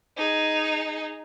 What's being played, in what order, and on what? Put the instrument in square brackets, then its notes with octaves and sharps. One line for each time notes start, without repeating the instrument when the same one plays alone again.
[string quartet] D#4 G#4